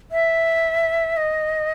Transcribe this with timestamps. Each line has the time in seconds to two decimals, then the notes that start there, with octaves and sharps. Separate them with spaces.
0.12 E5
1.17 D#5